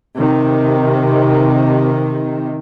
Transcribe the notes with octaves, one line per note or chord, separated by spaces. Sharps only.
C3 D#3